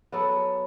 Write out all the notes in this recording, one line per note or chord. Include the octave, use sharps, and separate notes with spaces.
F#3 B3 F#4 A4